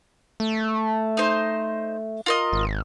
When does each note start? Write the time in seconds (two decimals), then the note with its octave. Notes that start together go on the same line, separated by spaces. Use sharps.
0.40 A3
1.17 D#4 C5
2.26 F4 A#4 D#5
2.53 G#1